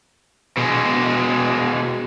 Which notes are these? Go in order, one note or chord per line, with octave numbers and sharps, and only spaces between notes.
B2 G#3